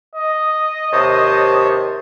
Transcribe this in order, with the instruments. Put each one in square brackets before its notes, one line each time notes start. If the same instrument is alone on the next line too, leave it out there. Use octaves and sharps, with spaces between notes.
[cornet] D#5
[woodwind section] D#2 C3 [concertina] C5 C#5 A5